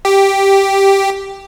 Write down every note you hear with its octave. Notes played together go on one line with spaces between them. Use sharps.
G4